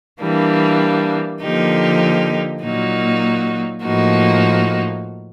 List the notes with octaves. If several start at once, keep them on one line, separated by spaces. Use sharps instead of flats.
E3 G3 A#3 D4
D3 F3 A#3 D#4 G4
A#2 F#3 A#3 D#4 F#4
A2 F3 A#3 D#4 F#4